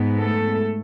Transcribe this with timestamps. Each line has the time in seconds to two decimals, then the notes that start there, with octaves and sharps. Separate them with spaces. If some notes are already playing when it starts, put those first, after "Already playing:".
Already playing: G#2 G#3 B3
0.21 A3 A4